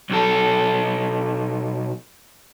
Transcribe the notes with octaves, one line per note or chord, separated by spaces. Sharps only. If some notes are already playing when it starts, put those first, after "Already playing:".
B1 A4